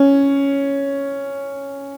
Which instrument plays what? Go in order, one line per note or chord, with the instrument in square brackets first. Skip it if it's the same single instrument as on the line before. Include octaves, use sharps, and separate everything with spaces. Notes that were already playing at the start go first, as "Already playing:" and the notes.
Already playing: [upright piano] C#4